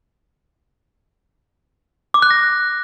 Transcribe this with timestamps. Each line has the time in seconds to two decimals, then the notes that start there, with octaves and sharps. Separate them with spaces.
2.14 D6
2.22 F#6
2.31 A#6